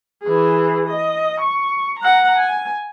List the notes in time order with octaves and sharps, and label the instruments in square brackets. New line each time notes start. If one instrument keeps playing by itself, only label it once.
[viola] E3 G#4
D#5
C#6
F#5 A#5
G#5